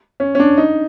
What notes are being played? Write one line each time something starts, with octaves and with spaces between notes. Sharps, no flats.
C#4
C#4
D4
D#4